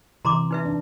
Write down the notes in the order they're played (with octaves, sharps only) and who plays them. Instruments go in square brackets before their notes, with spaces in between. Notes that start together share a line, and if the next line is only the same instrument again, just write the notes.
[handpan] C3 E3 [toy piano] A#5 C6 D6
[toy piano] D#4 B4 E5
[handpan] D4